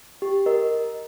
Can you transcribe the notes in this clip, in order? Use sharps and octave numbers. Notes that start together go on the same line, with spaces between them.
G4
A#4 D#5